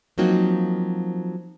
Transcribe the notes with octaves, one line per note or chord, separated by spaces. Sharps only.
F3 F#3 A#3 C4 D#4 F#4